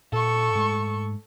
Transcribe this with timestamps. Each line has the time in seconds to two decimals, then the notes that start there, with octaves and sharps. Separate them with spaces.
0.12 A#2 A4 C#6
0.55 G#2 G#3 A3